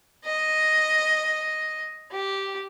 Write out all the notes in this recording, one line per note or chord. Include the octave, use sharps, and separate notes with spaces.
D#5
G4